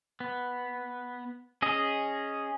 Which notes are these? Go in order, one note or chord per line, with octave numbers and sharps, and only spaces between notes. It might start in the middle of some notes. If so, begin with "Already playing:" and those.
B3
C#4 G#4 D#5